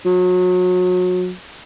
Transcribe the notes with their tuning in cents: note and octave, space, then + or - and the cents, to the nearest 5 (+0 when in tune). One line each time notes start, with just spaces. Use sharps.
F#3 -30